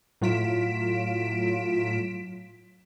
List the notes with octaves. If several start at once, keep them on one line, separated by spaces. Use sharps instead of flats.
A2 F#3 F4 B6 D7 E7